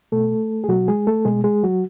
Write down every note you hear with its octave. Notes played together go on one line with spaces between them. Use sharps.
B2 A3 A4
G#4
B2 F#3 F#4
G#3 G#4
A3 A4
B2 G#3 G#4
G#3 G#4
F#3 F#4